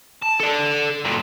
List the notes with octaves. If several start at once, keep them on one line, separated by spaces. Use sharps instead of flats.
A5
A4 D5
G2 A#2